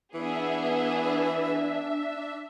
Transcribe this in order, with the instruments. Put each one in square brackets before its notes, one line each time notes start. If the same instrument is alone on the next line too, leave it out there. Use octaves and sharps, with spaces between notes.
[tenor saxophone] E3 [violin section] B3 G#4 [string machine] D4 E5